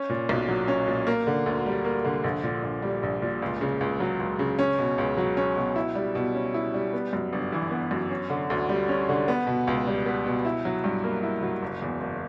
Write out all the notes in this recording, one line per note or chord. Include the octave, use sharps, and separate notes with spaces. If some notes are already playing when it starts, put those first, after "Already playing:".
Already playing: C#4
A#2
B1
F#3
C#4
A#2
A#3
D3
D2
G3
A#3
D3
A#1
A#2
A#1
G3
A#1
A#2
C#2
C#3
C#2
F#3
C#2
C#3
C#4
B2
C#2
F#3
C#4
B2
E4
G3
B2
C#4
E4
G3
B3
F#2
G1
E3
B3
F#2
C#4
D3
D2
G3
C#4
D3
B3
B2
C#2
G3
B3
B2
E4
F#3
G2
A#3
E4
F#3
F#1
E2
F#1